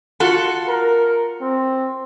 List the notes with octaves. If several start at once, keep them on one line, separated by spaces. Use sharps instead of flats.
F4 F#4 A4
A#4
C4